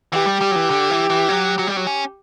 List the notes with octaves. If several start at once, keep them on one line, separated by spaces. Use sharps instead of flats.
E3 G4
G3
G3
F#3
E3
D3
E3
E3
F#3
F#3
G3
F#3
C#4